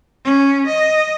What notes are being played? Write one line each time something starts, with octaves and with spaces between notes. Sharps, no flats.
C#4
D#5